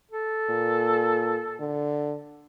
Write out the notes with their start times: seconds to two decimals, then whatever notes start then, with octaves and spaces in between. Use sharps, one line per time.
0.11 A4
0.50 A#2
1.60 D3